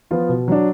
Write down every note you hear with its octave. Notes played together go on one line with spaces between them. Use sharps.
F3 B3 F4
B2
F#3 D4